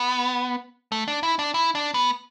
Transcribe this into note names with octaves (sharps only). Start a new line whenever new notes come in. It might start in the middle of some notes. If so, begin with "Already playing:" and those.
Already playing: B3
A3
D4
E4
D4
E4
D4
B3